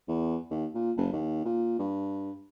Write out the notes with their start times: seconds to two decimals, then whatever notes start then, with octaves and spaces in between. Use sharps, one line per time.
0.08 E2
0.50 D#2
0.75 A#2
0.97 F#1
1.13 D#2
1.45 A#2
1.79 G2